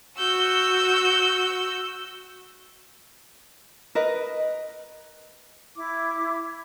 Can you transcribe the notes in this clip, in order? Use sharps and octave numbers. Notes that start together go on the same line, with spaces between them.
F#4 E6 G6
A#4 B4 D#5
E4 D6